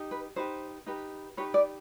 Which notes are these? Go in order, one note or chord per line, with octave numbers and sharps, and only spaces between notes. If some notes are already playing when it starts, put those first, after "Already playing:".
Already playing: D#4 G4
B4
D#4 G4 B4 C5
D#4 G4 B4
D#4 G4 B4 C#5
D5